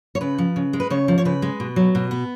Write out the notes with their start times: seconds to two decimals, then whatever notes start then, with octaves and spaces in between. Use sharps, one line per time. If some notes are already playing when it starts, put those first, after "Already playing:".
0.15 C#5
0.21 C#3 B4
0.38 F3
0.56 C#3
0.73 G#3
0.80 B4
0.90 C#3 C#5
1.08 F3
1.18 C#5
1.25 C#3 B4
1.42 G#3
1.60 B2
1.76 F#3
1.95 B2
2.11 B3